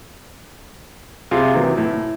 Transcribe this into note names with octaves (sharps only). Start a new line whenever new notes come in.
C3 F4 G#4
C3 D#3 E3 F#3
A2